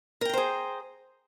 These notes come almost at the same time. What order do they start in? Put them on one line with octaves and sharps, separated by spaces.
A#4 G5 A#5 C5 G#4